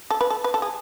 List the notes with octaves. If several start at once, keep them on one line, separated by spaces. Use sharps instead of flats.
A4
B4
A4
B4
A4
G#4